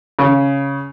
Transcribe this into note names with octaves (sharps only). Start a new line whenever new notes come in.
C#3